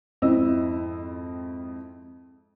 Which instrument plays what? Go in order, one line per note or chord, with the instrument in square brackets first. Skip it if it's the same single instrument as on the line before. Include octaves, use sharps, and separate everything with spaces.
[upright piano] F2 G#2 C4 E4 D#5 E6